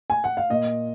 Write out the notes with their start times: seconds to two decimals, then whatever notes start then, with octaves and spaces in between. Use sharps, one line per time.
0.10 G#5
0.24 F#5
0.37 F5
0.50 A#2 D#5